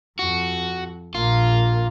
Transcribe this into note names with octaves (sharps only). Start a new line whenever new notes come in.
F2 F#4
A#1 A#3 F4